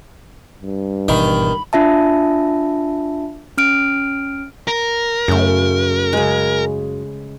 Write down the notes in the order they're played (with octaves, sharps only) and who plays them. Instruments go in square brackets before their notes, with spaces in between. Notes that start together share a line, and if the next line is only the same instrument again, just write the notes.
[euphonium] G2
[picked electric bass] G#1 B2 E3 [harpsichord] D#3 [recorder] B5
[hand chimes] D4 F4 E5 A5
C#4 F6 D7
[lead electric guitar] A#4
[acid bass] F#2 [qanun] C#3 A3
[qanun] C#3 G#3